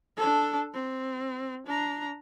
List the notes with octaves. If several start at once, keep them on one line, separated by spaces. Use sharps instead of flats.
D4 A4
C4
D4 A#5